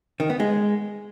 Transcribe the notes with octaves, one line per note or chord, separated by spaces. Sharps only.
D#3
B3
G#3